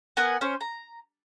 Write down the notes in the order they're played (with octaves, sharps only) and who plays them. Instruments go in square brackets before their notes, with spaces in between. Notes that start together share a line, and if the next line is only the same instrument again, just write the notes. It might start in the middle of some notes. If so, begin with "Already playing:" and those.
[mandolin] B3 A#4 F#5 G#5
C#4 C5
A#5